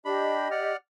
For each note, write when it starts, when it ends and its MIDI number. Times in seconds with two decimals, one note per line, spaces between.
0.05 0.48 62
0.05 0.72 67
0.05 0.72 75
0.05 0.48 83
0.51 0.77 74
0.51 0.77 78
0.51 0.77 89